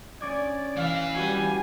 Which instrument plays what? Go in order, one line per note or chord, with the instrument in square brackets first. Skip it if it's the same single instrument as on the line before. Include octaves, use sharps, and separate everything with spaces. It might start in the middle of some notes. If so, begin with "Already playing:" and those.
[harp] C#4 D6 G#6 [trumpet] D5
[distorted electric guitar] E3 E4 [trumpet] F5
[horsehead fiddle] G3 G#5 [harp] F#4 B4